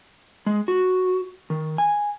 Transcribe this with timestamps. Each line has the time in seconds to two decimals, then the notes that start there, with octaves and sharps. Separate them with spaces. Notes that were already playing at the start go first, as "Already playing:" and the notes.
0.46 G#3
0.68 F#4
1.50 D#3
1.78 G#5